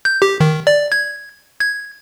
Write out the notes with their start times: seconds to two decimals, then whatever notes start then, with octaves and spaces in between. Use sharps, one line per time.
0.05 G6
0.22 G4
0.40 D#3
0.67 D5
0.92 G#6
1.60 G#6